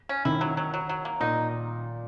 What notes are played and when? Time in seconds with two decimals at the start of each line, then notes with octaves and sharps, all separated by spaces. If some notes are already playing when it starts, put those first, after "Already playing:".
0.09 C#4
0.25 D#3 E4
0.41 F#3
0.57 F#3
0.74 F#3
0.89 F#3
1.05 A#3
1.21 A#2 D#4